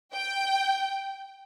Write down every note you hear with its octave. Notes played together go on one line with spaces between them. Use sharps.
G5